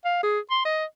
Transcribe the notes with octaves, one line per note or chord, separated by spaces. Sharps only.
F5
G#4
C6
D#5